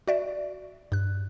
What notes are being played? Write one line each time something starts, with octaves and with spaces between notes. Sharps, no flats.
F#4 D5 E5
G2 F#6